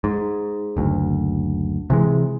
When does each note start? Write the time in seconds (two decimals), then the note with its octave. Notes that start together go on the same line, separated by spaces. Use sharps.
0.04 G#2
0.77 F#1 D2
1.90 C3 E3 G#3